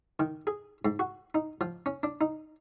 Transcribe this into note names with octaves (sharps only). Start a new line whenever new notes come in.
D#3
G#4
G#2
F#4
D#4
F3
C#4
D4
D#4